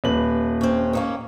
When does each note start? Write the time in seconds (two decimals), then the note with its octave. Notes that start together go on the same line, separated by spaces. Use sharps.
0.04 D#1 B4 F#7
0.61 C4 C#4
0.93 D#3 A#3 C#4